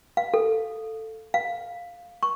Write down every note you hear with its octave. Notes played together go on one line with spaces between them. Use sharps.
F5
A4
F5
C#6